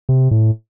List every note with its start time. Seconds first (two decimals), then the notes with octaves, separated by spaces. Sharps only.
0.09 C3
0.31 A2